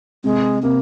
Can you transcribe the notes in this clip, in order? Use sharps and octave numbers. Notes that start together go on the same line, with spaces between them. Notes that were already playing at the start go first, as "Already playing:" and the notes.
C3 G#3
C3 A#3